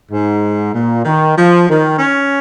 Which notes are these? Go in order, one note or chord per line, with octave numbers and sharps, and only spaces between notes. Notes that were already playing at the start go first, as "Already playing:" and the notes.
G#2
A#2
D#3
F3
D#3
C#4